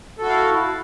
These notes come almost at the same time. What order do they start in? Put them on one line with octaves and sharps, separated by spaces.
A4 F#4 E4 F5